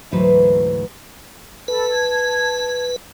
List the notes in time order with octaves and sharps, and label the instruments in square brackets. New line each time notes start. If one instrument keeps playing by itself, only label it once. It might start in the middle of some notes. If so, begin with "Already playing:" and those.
[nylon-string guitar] D2 G#2 E3 F#3 B4 C5
[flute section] A4 A5 B5 [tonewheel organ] B4
[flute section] A5 G#6